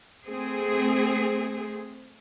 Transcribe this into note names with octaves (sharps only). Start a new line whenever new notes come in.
A3 C4 G#4